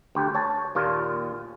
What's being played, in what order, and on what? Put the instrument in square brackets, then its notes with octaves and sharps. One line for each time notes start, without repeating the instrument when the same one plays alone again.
[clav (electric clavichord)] D2 G4
C#5 A5
D#2 A#2 F4